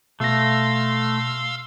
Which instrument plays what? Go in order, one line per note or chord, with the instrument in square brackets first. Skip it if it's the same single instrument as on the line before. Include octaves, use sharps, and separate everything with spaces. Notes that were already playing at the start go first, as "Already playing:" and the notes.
[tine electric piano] B2 A#6 [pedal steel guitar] A3 [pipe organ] F5 C6 E6